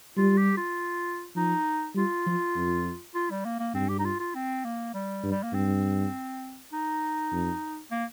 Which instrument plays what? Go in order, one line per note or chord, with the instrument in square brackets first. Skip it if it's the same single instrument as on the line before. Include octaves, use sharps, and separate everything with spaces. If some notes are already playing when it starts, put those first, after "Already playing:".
[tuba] G3 [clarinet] F4
[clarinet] G4
F4
[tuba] F3 [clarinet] D#4
[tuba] G3 [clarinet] F4
[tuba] F3
F2
[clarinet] F4
G3
A#3
A#3
[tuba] G2 [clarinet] C4
[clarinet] G4
D#4
F4
F4
C4
A#3
G3
[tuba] G2
[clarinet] G3
A#3
[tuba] G2 [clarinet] C4
[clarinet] D#4
[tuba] F2
[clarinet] A#3